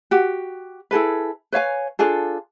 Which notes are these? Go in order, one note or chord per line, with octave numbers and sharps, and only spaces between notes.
F#4 G4
E4 G#4 A4 B4
B4 C#5 F5 G#5
D4 F4 G#4 A4